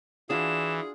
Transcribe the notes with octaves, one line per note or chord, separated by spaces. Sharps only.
E3 D4 F4 F#4 G#4 E7